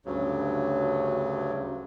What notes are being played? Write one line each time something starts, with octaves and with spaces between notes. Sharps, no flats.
D2 G2 C#3 F#3